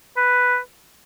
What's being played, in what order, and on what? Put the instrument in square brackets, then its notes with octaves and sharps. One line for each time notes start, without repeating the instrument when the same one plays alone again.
[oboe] B4